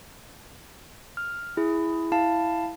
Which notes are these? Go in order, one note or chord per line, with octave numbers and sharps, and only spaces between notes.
F6
E4 G#4
E4 F5 A5